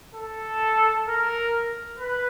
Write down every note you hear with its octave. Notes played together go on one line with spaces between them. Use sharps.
A4
A#4
B4